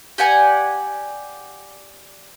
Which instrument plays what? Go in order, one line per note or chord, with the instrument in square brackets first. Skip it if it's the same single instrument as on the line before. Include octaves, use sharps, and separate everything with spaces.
[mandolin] G4 D5 F#5 G#5